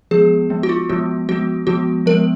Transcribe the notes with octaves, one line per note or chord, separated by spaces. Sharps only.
F3 G#3 B3 G#4
F3 G#3 B3
F#4
F4
F3 G#3 B3 F#4
F3 G#3 B3 F#4
F3 G#3 B3 F#4
F3 G#3 B3 A#4